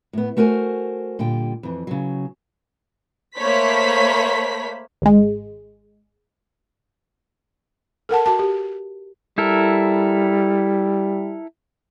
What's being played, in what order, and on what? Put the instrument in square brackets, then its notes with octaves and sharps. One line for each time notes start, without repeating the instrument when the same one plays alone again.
[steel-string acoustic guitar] A2 B3
A3 F#4 A#4 C5 G#5
A#2 D3 G3 G5
F2 E3
C#3 F#3
[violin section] A3 A#3 C5 C#5 B5 B6
[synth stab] G#1 G#3
[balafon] A4 A#4 F#5 A5
F#4 A5
G4
[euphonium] G3 [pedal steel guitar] E4 A4 A#4